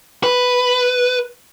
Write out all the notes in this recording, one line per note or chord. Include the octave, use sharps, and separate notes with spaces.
B4